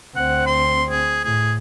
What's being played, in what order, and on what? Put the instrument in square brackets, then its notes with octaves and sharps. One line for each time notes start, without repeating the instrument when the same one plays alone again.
[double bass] D2 C4 [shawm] F#5
[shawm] C6
G#4
[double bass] A2 [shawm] G#4